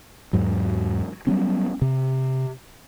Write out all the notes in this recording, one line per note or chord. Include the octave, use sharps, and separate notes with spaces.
E2 G#2 F#3
F#3 G3 B3 C#4
C3